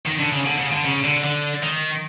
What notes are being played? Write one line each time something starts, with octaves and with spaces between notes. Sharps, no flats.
D#3
D3
C#3
D3
C#3
D3
C#3
D3
D3
D#3